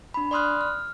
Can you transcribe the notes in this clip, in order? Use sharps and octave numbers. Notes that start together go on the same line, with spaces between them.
D4 B5
D5 B5 C6 D#6 F6 F#6
F6